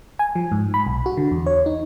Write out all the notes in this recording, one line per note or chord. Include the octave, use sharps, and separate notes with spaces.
G#5
F3
G#2
B5
B1
F#4
D3
E2
C#5
D#4